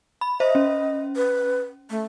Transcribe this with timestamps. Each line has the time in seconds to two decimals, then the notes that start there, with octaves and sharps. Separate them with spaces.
0.21 B5
0.40 C5 D#5 E5
0.55 C#4
1.16 B4
1.90 A3